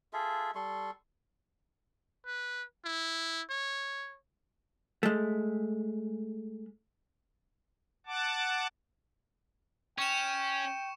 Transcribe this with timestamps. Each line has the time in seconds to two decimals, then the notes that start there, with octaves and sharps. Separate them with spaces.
0.13 F4 G#4 A4 E5
0.55 G3 A4 C6 C#6
2.26 B4
2.85 E4
3.50 C#5
5.03 G#3 A3
8.06 F#5 A5 D6
9.99 C#4 G5 C#6 C#7 E7